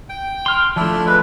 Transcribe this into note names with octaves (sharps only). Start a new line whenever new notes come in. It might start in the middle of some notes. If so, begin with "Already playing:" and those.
G5
C6 F6
F3 A3 D4 E4
G#3 B4